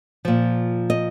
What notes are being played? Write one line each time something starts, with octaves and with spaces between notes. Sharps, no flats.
A#2 F3
D#5